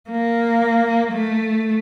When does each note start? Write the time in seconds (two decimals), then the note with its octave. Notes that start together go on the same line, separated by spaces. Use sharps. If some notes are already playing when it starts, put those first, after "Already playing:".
0.10 A#3
1.12 A3